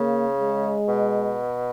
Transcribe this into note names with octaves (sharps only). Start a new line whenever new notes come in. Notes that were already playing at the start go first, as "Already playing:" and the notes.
Already playing: C#3 A#3
G#3
B2